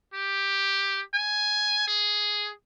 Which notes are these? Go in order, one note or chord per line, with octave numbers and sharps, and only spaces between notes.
G4
G#5
G#4